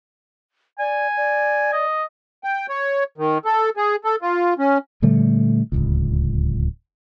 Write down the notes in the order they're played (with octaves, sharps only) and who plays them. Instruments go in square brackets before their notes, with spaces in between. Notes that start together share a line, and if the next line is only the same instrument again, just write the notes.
[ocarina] D5 [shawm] G#5
[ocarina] D5
[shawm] D#5
[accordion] G5
C#5
D#3
A4
G#4
A4
F4
C#4
[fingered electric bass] A#2 D3 G3 A3
D1 G#1 C#2